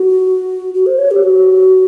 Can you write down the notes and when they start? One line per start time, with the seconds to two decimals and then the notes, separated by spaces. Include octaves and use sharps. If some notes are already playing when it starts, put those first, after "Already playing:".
Already playing: F#4
0.74 F#4
0.86 C5
0.98 C#5
1.11 G4
1.23 F#4